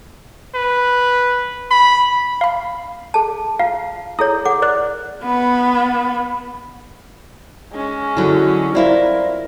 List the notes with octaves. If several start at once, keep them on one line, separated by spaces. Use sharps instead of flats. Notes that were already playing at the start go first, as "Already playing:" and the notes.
B4
B5
F5 B5
G#4 A5
F4 F5
E4 G#4 C#5 D#6
G#4 F#5 D6
A#4 D5 F#6
B3 B5
G#3 C#4
D3 F#3 E4 F#4
C4 E4 F4 A#4 D5 F5